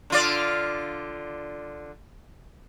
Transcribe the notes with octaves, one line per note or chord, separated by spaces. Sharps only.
D3 F4 D5